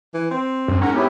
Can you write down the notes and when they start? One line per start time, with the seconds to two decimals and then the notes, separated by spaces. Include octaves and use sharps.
0.14 E3
0.31 C4
0.68 F#2
0.82 G#2 C#4 A#4 F#5 A#5
0.94 B3 C#4 E4 G4